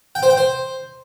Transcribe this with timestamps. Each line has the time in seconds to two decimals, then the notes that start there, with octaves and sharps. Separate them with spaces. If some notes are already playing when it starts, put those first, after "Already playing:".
0.15 G5
0.23 C5
0.30 G5
0.37 C5